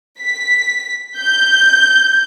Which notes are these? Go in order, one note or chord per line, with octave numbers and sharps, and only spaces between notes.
B6
G6